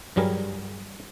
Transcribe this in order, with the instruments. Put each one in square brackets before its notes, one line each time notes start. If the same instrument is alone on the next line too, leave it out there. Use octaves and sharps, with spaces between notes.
[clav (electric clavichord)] G2 F#3 G3 G#4 A#4